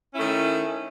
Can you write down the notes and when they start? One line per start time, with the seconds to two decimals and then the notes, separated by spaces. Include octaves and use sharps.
0.12 C#4
0.15 E4
0.18 A3
0.20 D#3